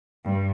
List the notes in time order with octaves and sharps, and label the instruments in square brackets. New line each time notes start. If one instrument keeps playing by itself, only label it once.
[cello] G2